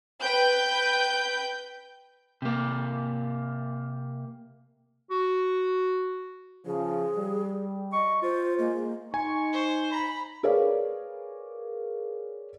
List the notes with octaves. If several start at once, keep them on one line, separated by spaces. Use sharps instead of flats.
B4 G5 G6
C3 A#3
F#4
C#3 F3 G#4
G3
D#5 C#6
F4 C5
G#3 A#3
D#4 G#5 A#5 C6 C#6
C5
A#5 B5
G#4 A#4 B4 C#5 D5 F5